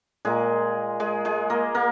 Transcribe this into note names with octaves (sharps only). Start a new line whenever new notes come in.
A#2 G#3 A#3 G#4
G#3 G#4
G#3 G#4
A#3 A#4
A#3 A#4